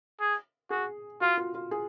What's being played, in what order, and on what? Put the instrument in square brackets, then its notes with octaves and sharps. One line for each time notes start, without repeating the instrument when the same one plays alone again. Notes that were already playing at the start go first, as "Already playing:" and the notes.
[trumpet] G#4
[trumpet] F#4 [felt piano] G#4
[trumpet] F4 [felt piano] F#4
[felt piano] F4
F4
G#4